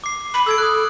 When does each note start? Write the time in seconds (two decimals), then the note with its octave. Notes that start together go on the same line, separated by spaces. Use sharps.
0.04 D6 C7
0.34 B5 F#7
0.46 A4 E6 G#6 D7
0.58 A4 D#6 F#6